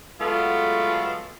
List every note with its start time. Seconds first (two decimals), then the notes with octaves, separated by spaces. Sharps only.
0.20 F#3 G#3 A3 B3 F4 A4